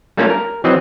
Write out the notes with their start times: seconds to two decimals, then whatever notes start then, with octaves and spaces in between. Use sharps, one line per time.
0.17 G3 A3 A#3 C#4 F4 F5
0.30 A#4
0.64 E3 F#3 C4 D#5